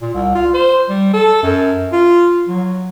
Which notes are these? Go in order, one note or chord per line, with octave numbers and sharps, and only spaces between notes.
A#2
C2
F4
C5
G3
A4
F#2
F4
F#3